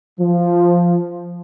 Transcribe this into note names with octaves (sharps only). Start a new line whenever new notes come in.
F3